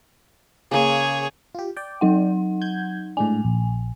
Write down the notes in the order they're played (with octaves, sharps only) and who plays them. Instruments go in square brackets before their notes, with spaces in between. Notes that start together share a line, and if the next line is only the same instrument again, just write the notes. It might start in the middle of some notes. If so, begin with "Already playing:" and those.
[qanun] C#3 A#3 [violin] G#4 C#5
[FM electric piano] F4 G4
D5 G5
[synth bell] F#3 D#4 F#5
[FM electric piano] G6 G#6
[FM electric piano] A2 G#3 D4 [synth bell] G#5
[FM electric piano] A#1